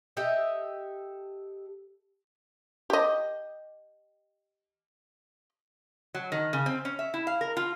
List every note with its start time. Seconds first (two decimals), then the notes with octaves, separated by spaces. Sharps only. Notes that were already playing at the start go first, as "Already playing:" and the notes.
0.17 G4 A4 D#5 E5
2.90 G4 D#5
6.15 F#3
6.32 D#3
6.53 C#3
6.66 C4
6.85 C#4
6.99 E5
7.14 E4
7.27 F5
7.41 A#4
7.57 F4